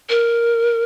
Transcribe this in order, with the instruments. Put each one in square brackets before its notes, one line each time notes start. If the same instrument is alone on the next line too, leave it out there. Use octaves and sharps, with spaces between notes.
[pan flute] A#4